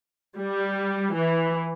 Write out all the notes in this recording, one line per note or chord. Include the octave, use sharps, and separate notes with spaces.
G3
E3